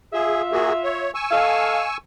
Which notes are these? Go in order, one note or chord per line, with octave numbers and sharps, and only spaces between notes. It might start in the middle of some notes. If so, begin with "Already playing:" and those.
F4 G#4 E5
A#3 F#4 G#4
C#5
G#5 C#6 E6
A4 D#5 F5